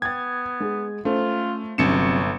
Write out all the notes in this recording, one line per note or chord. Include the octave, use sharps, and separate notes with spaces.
B3 G5 G#6 A6
G#3 G#4
A3 C#4 F4 A4 C5
G1 C3 F#3 A3 C#4 C#7 E7